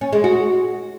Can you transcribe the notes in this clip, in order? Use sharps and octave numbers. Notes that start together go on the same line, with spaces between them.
C#4
G#3
F#4